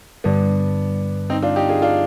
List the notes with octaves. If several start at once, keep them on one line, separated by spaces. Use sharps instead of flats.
G2 D3 G3 B3 D4
C4 D#4
D4 F4
D#4 G4
F4 G#4
D4 F4